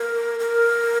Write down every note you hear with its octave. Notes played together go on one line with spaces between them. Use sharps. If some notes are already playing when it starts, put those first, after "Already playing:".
Already playing: A#4
A#4